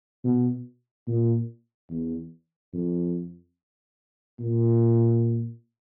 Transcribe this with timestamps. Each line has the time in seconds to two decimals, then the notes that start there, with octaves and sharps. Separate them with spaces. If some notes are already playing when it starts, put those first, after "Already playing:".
0.24 B2
1.07 A#2
1.90 E2
2.73 F2
4.40 A#2